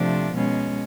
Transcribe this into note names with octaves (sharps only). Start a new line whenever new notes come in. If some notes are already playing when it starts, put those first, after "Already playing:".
Already playing: C3 F3 A3 D4
B2 G#3 C#4